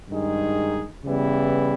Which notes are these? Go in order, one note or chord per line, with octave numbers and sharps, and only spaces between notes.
G2 D#3 G#3 D#4 G#4
C#3 E3 G3 B3 E4